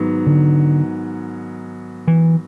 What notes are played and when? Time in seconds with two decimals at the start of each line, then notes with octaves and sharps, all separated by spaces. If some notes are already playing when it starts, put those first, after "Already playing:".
Already playing: G#2 D#3 F#3 B3
0.27 D3
2.08 E3